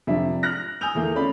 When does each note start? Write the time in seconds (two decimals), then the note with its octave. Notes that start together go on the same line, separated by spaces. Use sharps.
0.07 F2 C3 D4 E5
0.43 F6 F#6 A#6
0.81 G#5 D#6 E6 G6 F7
0.95 E2 A3 A#3
1.15 B3 C#4 F4 D5 B5